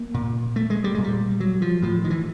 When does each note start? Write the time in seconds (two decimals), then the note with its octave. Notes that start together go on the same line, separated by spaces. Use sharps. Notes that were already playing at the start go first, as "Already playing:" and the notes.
Already playing: A#3
0.14 A#2
0.56 A3
0.70 G#3
0.84 G3
0.95 A#2 G#3
1.04 G3
1.40 F#3
1.62 F3
1.82 A2 F3
2.04 D#3
2.10 E3